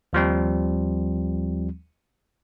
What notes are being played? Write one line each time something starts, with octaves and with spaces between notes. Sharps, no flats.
D#2 F3 G3 C4